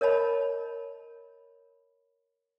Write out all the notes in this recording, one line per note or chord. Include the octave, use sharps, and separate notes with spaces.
A#4 C#5 D#5 A5 B5